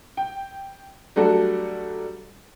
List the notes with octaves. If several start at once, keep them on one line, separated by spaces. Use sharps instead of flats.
G5
F#3 G3 A3 D4 F#4 A4